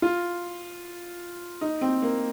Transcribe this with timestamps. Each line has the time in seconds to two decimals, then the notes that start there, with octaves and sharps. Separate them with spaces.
0.02 F4
1.61 D#4
1.81 C4
2.02 A#3